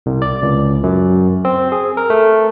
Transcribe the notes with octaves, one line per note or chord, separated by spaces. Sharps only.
C2
D5
C#2
F#2
C4
G#4
A#4
A3